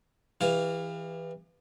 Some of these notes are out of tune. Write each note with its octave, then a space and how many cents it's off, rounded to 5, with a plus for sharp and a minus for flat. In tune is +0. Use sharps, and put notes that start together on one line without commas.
E3 +0 G4 +45 F5 +0